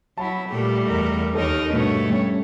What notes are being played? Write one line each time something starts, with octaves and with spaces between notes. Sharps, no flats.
F#3 E4 A5 B5
A#2 G3 A3 G4
E2 A#4
D#2 D#4 A4 A#4 C#5
G2 B2 A3 F#4 C#5
G3 C#4 G4